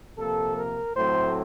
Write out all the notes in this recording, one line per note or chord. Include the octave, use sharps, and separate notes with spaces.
C3 F3 A#3 A4
A#4
A2 F#3 A3 C4 C5